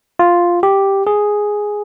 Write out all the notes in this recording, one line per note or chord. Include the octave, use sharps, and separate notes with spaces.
F4
G4
G#4